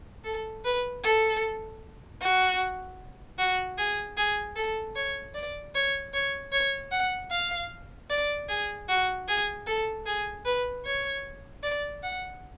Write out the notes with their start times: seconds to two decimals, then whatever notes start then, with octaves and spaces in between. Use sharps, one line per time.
0.24 A4
0.64 B4
1.04 A4
2.20 F#4
3.38 F#4
3.77 G#4
4.17 G#4
4.56 A4
4.95 C#5
5.35 D5
5.75 C#5
6.13 C#5
6.52 C#5
6.91 F#5
7.31 F5
8.10 D5
8.48 G#4
8.88 F#4
9.28 G#4
9.67 A4
10.06 G#4
10.45 B4
10.85 C#5
11.63 D5
12.03 F#5